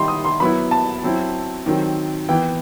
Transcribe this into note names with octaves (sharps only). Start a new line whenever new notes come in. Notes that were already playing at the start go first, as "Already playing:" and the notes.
Already playing: D#3 G3 D#4 B5 C6
D#6
C6
F#3 B3 E4 B5
A5
F#3 C4 E4
D#3 F#3 C4
E3 B3 E4 G5